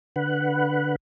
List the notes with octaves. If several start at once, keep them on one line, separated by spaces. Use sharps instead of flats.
D3 B4 F#5